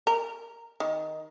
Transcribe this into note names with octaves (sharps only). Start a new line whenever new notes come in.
A#4
D#3